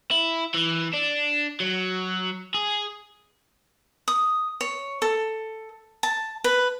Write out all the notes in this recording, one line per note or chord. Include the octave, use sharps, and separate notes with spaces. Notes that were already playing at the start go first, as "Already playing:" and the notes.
E4
E3
D4
F#3
G#4
D#6
C#5
A4
A5
B4